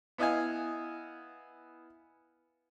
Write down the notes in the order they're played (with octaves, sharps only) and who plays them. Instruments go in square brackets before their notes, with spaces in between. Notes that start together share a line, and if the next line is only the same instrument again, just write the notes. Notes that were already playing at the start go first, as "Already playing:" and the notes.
[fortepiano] B3 E4 D#5 F5 G#5